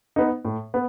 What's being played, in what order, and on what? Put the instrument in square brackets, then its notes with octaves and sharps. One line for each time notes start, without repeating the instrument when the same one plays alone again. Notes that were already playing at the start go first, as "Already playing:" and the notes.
[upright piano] B3 D#4
A2
B3